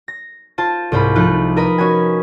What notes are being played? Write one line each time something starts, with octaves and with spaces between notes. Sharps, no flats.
A#6
F4 C5 A5
C2 G#2 C5 F5 B5
F3 A3 D#4 F4 F#6
A#4 B4 D#5 A#5 B5 D#6
C#4 F#4 G#5